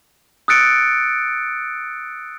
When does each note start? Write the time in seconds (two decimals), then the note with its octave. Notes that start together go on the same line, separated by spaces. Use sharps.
0.48 D#6 E6 F#6 A6 C#7 D7